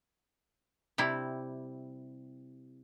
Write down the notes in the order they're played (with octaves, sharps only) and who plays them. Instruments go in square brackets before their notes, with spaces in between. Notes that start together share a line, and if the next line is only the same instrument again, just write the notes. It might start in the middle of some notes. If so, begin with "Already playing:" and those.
[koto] C3 G3 E4